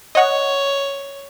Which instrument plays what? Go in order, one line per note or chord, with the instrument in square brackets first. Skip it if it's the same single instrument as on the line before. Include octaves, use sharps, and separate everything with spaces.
[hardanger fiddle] C#5 [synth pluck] D#5 F#5